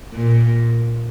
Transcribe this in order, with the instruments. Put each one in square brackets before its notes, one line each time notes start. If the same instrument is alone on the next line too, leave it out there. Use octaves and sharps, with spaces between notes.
[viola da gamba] A#2